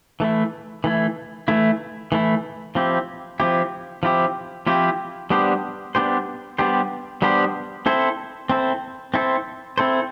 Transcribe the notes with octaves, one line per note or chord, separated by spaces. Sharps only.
E3 A3 E4
E3 A3 E4
E3 A3 E4
E3 A3 E4
F3 C4 E4 G4
F3 C4 E4 G4
F3 C4 E4 G4
F3 C4 E4 G4
G3 B3 D4 G4 C5
G3 B3 D4 G4 C5
G3 B3 D4 G4 C5
G3 B3 D4 G4 C5
C4 E4 A4 C5
C4 E4 A4 C5
C4 E4 A4 C5
C4 E4 A4 C5